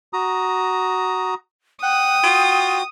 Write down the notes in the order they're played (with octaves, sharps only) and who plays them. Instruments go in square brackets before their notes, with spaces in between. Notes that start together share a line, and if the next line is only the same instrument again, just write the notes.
[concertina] F#4 A#5 D#6
[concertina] F#5 F#6 [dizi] G5 [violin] D#6
[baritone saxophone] F4 [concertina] F#4